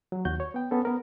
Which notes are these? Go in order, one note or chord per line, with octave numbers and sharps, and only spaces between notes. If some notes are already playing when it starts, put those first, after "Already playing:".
F#3
D#2 F#4 G6
C#5
B3 G5
B3 C#4 A4
B3 A#4